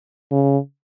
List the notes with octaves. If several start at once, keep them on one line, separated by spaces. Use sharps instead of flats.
C#3